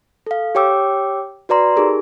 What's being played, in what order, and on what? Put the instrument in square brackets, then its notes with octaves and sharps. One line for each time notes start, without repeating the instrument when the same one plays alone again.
[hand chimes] A4 F5
G4 C#5 G5 D6 E6
F#4 B4 D5 A#5 C6
D#4 G4 G#4 A#4